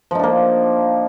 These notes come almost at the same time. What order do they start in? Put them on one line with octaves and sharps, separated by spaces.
F3 D#4 D4 A#3